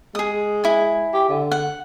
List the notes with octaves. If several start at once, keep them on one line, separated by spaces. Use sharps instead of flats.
G#3 G#4 D#6
E4 G#5
G4
D3
F#5